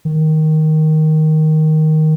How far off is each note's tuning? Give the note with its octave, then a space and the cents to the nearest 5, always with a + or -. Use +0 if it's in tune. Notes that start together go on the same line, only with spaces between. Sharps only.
D#3 +5